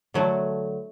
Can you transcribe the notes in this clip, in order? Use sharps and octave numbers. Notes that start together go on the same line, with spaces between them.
D3 F#3 A3